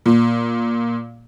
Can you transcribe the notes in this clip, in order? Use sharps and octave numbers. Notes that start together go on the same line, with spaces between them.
A#2